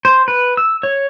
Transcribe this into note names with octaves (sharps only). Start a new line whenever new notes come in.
C5
B4
E6
C#5